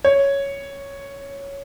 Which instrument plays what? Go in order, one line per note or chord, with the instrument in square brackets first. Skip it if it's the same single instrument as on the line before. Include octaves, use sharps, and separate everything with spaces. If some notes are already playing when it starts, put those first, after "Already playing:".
[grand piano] C#5